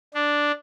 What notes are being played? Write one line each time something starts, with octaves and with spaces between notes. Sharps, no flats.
D4